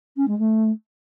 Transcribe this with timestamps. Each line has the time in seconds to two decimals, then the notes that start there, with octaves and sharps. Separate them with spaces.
0.16 C#4
0.27 G#3
0.38 A3